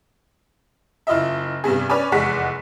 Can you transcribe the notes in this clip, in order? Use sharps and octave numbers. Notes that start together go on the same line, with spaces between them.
F#1 E4 F4 D#5 E5
G2 C3 B3 G#4
C#4 B4 C#5 D5 G#5
F1 E2 G#3 F#5 C#6 B6